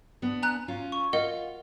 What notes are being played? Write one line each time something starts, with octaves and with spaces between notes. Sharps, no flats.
B3 D4
G#5 A#5 F#6
C#4 F4
C#6
F4 A#4 D#5 F#5